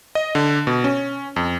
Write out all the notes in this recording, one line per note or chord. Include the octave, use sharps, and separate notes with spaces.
D#5
D3
B2
C#4
F2